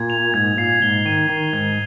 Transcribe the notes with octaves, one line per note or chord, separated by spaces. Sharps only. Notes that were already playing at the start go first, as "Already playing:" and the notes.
Already playing: A#2 G#6
F7
G#2 G#6
A#2 C7
G#2 G7
D#3 D#7
D#3 C7
G#2 G#6